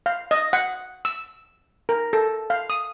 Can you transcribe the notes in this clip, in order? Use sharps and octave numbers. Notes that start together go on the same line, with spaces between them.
F5
D#5
F#5
E6
A#4
A4
F5
D#6